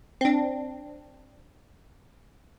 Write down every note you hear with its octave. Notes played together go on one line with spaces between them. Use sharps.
C4 D4